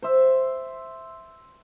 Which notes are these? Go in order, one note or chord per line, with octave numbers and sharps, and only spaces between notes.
C5 E5